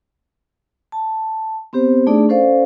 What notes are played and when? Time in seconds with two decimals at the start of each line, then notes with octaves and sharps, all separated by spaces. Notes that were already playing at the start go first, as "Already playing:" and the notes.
0.92 A5
1.73 B3 C4 G4 C5
2.07 A3 D4 D#4 G#4 D5
2.29 C#4 A4 C5 D5 F5